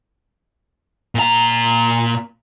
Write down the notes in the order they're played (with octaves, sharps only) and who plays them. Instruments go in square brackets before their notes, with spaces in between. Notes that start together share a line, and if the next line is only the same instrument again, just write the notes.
[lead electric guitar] A#2 A#5